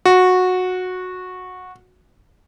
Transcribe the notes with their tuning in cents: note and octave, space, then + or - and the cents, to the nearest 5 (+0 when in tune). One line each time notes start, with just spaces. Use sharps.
F#4 -15